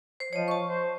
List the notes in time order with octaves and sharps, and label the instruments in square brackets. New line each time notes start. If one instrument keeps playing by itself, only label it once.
[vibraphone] C5
[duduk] F3 [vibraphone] C#5 D#5
[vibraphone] A5 C#6
[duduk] C5